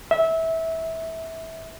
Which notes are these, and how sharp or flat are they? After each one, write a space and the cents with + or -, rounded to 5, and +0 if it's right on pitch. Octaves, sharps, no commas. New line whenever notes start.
E5 -20